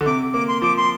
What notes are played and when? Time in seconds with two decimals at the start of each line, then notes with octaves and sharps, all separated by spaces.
0.01 D3
0.06 C3 D6
0.33 A#3 D6
0.48 C6
0.62 F3 D6
0.77 C6